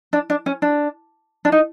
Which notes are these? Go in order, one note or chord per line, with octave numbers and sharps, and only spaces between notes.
D4
D4
C#4
D4
D4
D#4